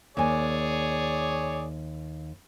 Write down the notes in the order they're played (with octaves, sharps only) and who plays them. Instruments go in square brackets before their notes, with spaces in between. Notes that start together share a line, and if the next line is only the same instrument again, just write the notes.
[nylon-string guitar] D#2 G#5 [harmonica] G#4 C#5 D5